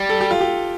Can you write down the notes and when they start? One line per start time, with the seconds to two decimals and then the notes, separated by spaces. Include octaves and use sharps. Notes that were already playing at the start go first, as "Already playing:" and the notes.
Already playing: G3
0.09 A4
0.21 G4
0.31 F4
0.41 G4